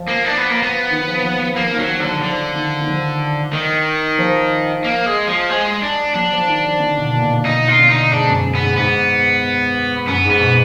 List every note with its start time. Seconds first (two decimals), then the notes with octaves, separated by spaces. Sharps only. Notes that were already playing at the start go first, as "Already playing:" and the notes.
Already playing: F3
0.08 A#3
0.25 D4
0.38 B3
0.50 A#3
0.62 B3
0.90 D#3
1.08 F3
1.23 F3
1.40 F3
1.56 F3 A#3
1.73 D#3
1.78 F#3
1.89 F3
2.00 D3 F#3
2.21 D3 F3
2.55 D#3
2.81 D#3
2.87 F3
3.53 D#3
4.18 F3
4.84 A#3
5.06 G#3
5.27 F3
5.50 G#3
5.82 D4
6.14 F#3 D4
6.32 F3
6.47 D#3
6.64 F3
6.80 D3
6.97 B2
7.13 A#2
7.30 B2
7.45 B2 D#4
7.68 F4
7.78 D3
7.90 D#4
8.11 G#2 D4
8.27 F#2
8.44 F#2
8.55 B3
8.60 G#2
8.76 G#2 B3
10.07 F#2 B3
10.24 G#2
10.30 B3
10.40 B2